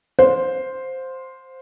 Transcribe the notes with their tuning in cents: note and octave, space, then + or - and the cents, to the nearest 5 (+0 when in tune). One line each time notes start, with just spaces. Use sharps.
C5 +0 F5 +35